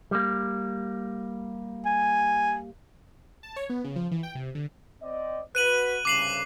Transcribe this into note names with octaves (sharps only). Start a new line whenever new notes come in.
G3 A#3
G#5
A5
C#5
B3
C#3
F3
E3
G5
C3
D3
C4 D5 D#5
F#4 B4 F#6 D#7 F#7
C2 G2 C#3 D6 C7 F#7